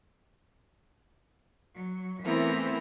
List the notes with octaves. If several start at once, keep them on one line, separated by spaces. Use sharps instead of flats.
F#3
E3 A3 B3 C4 E4 A#4